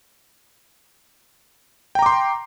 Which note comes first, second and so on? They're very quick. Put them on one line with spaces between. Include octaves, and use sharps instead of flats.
G5 A#5 D6 C6